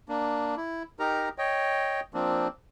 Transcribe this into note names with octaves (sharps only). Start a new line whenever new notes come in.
A#3 D4
E4
D#4 G4 A#4 A#5
C#5 D#5 G5
F3 A#3 C4 D4